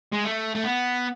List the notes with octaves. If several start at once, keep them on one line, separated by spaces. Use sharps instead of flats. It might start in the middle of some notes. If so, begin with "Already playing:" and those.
G#3
A3
A3
B3